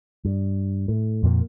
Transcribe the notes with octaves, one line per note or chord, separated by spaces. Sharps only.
G2
A2
F2 A#2 F3 A#3